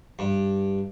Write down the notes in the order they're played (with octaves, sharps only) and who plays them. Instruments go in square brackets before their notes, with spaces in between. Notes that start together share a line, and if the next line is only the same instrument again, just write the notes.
[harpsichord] G2